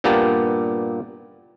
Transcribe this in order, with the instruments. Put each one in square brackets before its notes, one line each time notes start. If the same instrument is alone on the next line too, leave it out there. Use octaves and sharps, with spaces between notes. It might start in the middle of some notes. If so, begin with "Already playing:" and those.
[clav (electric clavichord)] G2 A#2 A#3 B3 G4 A5